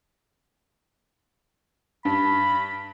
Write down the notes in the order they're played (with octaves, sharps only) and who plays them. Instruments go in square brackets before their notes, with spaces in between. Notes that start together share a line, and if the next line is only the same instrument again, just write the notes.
[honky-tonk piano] G2 [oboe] B5